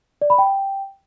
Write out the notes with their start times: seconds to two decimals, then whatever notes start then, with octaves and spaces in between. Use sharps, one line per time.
0.22 D5
0.30 B5
0.38 G5